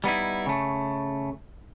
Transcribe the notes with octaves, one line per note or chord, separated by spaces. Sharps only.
G3 B3 D#4 E4
C#3 A3